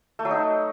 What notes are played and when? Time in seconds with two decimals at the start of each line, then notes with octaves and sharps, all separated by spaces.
0.19 A3
0.25 F#3
0.31 D#4